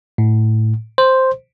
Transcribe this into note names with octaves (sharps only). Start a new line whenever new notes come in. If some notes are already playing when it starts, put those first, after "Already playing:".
A2
C5